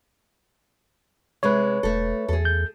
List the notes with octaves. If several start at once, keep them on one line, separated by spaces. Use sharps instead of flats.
C3 G#3 B4 C#5
E1 A3 A4
E2 G#4 A4
G6